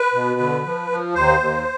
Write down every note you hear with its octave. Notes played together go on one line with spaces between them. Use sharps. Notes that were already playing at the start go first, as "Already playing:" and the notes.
Already playing: B4
B2
D3
F3
F3
D#2 C5
D#2